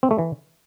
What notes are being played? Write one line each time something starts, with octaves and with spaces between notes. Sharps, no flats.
C4
A3
E3